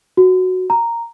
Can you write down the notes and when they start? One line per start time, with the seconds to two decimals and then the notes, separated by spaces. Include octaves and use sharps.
0.17 F#4
0.70 A#5